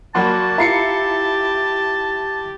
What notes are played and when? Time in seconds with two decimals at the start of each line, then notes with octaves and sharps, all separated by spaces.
0.15 F#3 A#3 F#4 D5 A5 B5 C6
0.58 E4 F4 G4 F5 A#5 C7 C#7